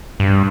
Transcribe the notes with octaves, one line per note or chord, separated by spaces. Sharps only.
G2